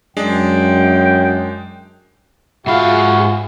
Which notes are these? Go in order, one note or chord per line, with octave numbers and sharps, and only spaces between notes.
F#2 G#3 D4 G5
G#2 F4 F#4 G#4 E5 F5 B5 F6